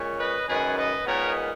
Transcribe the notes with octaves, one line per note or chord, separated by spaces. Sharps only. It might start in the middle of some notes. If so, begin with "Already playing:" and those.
Already playing: A#2 G#3 C#4
B4 D#5
F#2 D#3 G#3 C#4 G#4 B4
B4 D#5
A#2 G#3 B3 D#4 A#4 C#5